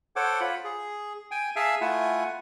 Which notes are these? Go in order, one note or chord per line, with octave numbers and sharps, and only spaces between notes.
A4 C5 C#5 F#5 D6
F4 B5
G#4
G5 G#5
G#4 E5 F5 G#5 A5 E6
A3 E4 F4 F#5 G#5